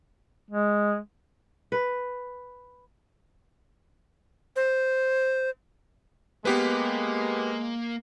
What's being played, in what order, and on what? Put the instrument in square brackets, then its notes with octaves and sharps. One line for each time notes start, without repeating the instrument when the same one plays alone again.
[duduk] G#3
[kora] B4
[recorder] C5
[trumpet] G#3 [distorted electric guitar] A#3 [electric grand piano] B3 G4 B4